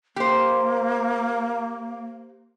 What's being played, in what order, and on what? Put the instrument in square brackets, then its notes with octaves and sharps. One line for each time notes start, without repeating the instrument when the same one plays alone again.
[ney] A#3 [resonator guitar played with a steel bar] G4 C5